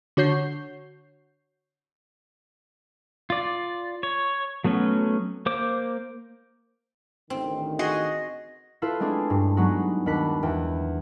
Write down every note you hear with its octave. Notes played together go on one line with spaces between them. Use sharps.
D3 F#4 C#5 G6 C7
F4 D5
C#5
F#3 A3 B3 C#4
A#3 C5 D6
A1 D3 D#3 C4
F#4 G#4 D#5 C6
E4 F4 A4 B4 F5
G#3 A3 C4 D4 G#4
G2
F#3 G#3 B3 D#4 F#4
D#2 D4 F#5 B5 F#6 B6
E2 G5